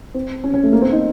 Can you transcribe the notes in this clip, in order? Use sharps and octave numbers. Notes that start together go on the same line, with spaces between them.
C4
C#4
C#4
A3
A#3
C4
D#4